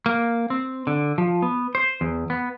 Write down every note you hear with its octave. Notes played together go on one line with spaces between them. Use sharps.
A#3
C4
D3
F3
B3
C5
E2
B3